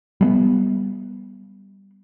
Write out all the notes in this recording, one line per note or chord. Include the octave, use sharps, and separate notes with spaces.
G3 G#3 B3